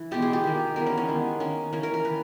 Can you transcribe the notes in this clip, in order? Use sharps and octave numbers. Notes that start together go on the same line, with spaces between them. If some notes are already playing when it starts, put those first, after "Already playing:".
Already playing: E3
B2 G#3 B3 G4
G#4
G4
D#3 A#3
E3 G3 B3 A#4
C#4
C#4
D#3 G#3 B3
D#3 A#3 C#4
E3 A#3 C#4
A#4
A#4
D#3 B4